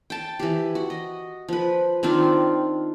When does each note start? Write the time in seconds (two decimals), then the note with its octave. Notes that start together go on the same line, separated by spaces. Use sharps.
0.10 G5 A5
0.39 E3 G4
0.75 F#4
0.90 D#5
1.48 F3 B4
2.03 D#3 C4 D4 F4